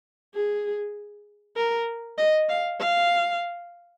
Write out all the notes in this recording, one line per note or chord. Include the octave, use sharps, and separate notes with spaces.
G#4
A#4
D#5
F5
F5